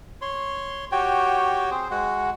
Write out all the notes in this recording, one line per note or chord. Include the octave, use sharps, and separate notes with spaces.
C#5 C6
F#4 G4 C#5 G5
C4 G#4 C5
G#3 F#4 F#5